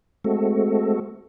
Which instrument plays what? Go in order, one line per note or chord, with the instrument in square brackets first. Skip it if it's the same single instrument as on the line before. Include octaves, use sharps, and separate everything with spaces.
[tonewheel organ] G#3 A3 C4 F#4 A4